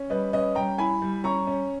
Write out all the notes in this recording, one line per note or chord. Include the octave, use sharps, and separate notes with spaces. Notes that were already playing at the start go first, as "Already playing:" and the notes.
Already playing: C#4
G3 B4 D#5
C#4 B4 D#5
G3 G5 A#5
E4 G#5 B5
G3
C#4 A#5 C#6
C#4